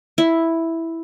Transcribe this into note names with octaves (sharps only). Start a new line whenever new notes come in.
E4